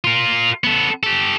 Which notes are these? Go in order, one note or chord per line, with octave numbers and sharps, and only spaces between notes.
F4 A#4
B3 A4
G4 A4